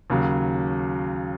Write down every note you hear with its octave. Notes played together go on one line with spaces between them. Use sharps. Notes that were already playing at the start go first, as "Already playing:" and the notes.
D#2 C#3 F#3